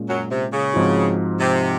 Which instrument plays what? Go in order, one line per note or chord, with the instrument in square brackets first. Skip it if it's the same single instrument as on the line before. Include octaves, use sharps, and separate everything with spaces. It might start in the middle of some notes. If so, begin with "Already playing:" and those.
Already playing: [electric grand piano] A#2 G#3 C#4
[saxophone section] F#2 F#3
C3
C#3
[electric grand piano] G#2 F3 C4 D#4 F#4
[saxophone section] C3